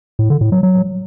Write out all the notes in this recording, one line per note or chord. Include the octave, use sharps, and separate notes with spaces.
A2
D3
A2
F#3
F#3